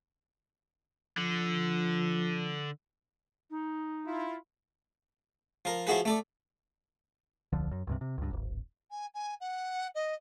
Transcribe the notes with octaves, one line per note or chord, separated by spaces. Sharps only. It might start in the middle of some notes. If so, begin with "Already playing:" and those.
D3 F3
D#4
E4 F4
F3 A#4
F3 E4 F#4 G#4 B4
A3 A4 D5
D#1 C2 D3 F3
F#2
C#2 G2 C3
C3
C#2 G2
D1 G#1
G#5
G#5
F#5
D#5